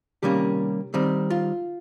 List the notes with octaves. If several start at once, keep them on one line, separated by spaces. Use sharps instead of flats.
C3 D#3 G3 A#3 C#4 G4
D#3 G3 C4
F4